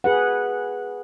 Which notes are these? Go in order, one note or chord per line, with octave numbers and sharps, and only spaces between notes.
G#4 B4 F#5